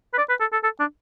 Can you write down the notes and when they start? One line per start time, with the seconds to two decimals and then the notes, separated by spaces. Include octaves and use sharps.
0.13 B4
0.18 D5
0.29 B4
0.40 A4
0.52 A4
0.63 A4
0.80 D4